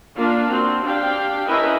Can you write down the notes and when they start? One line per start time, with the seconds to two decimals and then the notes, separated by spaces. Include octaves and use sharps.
0.17 A#3 D4 F4 F5
0.50 C4 F#4
0.85 D4 G4 F5 G5
1.48 C#4 E4 A#4 B4 D#5 E5